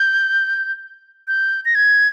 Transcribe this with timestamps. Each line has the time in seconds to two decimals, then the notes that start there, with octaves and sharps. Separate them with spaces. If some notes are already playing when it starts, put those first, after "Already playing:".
Already playing: G6
1.28 G6
1.65 A#6
1.75 G#6